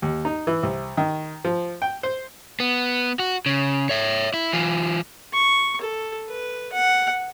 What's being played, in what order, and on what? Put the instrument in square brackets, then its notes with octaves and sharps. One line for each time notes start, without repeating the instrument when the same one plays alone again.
[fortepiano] D#2
D#4
E3
C2
D#3
F3
G5
C5
[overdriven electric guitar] B3
F#4
C#3
C#5 E5
E4
E3 F4
[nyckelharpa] C#6
A4
B4
F#5